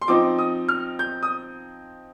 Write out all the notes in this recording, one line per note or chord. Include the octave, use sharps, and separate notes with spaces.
C6
F3 C4 D#4 D6
D#6
F6
G6
D#6